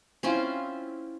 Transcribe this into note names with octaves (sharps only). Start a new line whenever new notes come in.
C4 C#4 E4 F4